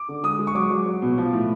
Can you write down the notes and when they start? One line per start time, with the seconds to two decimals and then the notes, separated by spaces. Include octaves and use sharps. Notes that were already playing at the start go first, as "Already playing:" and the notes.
Already playing: D6
0.08 D3
0.23 G#3 D#6
0.39 G#3
0.47 C#6
0.55 F#3 D6
0.70 F#3
0.86 F#3
1.02 B2
1.18 F3
1.33 A2